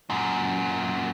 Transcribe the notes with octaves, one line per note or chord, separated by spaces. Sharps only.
F#2 A#2